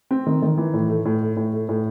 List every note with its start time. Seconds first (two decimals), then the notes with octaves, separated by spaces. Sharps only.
0.11 C4
0.26 D#3
0.42 D#3
0.58 E3
0.74 A2
0.89 A3
1.05 A2
1.22 A3
1.37 A2
1.53 A3
1.69 A2